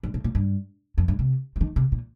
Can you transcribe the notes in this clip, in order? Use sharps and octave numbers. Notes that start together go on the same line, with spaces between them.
G2
A#2
A#2
G2
F2
G2
C3
F3
D#3
C3
A#2